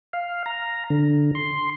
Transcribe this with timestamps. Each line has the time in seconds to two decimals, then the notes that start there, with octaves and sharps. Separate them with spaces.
0.13 F5
0.46 A#5
0.90 D3
1.35 C6